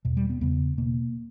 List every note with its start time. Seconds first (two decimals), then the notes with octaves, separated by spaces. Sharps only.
0.05 E2 B2
0.17 G3
0.30 B3
0.41 E2 C#3 B3
0.78 B2 A#3